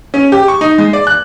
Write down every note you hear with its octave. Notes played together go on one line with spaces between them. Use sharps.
C#4
G4
C#6
D#4
G#3
D5
F#6